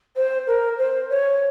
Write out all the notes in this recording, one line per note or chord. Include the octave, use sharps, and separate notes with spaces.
C5
A#4
C5
C#5